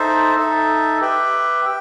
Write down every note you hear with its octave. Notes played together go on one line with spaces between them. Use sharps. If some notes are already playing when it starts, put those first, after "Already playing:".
Already playing: D#4 A4 C5 E5
D#4 A4 E5
G4 B4 E5 G5
G5